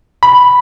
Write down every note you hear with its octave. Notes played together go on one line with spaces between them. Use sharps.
B5